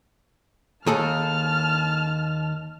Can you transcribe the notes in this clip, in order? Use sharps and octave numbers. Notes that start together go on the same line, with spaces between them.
D#2 G#4 A4 A5 F6